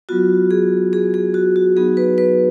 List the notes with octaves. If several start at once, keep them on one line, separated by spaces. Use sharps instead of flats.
F#3 B3 F4 F#4
G#4
G#4
G#4
F#4
F#4
F#3 B3 D#4 F#4 G#4
B4
B4